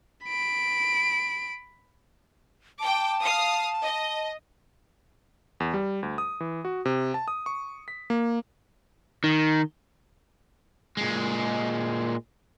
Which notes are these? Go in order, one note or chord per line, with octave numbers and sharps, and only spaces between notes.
B5 D7
G5 A5 D6
F5 D#6
D#5
E2
G3
D2
D#6
E3
F#4
C3
A5
D#6
C#6
B6
A#3
D#3
A#2 G#3